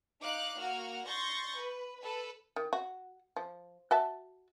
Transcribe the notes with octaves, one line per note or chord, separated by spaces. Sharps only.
D#4 F5 D6 F#6
A#3 F#4 F#5 F6
C6 C#6 G6 A6 A#6
B4
A4 B4
D#3
F#4
F3
F#4 E5 A5